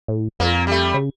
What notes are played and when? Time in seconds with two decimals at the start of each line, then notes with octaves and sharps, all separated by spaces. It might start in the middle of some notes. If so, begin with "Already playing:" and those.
0.08 A2
0.40 F2 A#2 A#3
0.67 G3 A3
0.94 C#3